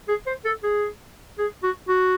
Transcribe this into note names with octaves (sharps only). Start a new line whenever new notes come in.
G#4
C5
A4
G#4
G#4
F#4
F#4